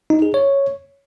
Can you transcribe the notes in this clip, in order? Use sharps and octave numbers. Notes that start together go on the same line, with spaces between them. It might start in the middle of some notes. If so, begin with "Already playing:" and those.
D#4
G#4
C#5